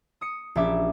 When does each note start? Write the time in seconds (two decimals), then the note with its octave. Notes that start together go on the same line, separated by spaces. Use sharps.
0.21 D#6 C#7
0.55 A#1 C#4 G4 E5 D6